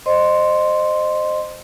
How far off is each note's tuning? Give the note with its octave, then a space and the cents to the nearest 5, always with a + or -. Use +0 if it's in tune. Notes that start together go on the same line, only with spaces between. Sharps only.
C5 +0 D#5 -25 C6 +0